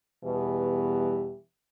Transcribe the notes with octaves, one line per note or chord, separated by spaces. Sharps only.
E2 B2 E3 G3 G4 B4